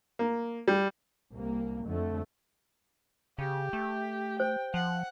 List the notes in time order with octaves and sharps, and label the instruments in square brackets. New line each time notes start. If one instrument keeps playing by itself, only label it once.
[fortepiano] A#3
G3
[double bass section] C2 A#3
F2 D3 A3
[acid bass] C#3 [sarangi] G4
[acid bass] A3
[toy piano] C5 [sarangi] G5
[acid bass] F3 [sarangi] F#5